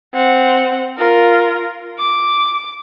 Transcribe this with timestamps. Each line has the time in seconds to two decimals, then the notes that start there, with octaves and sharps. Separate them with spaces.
0.14 C4 F#5
0.98 F4 A#4
1.98 D6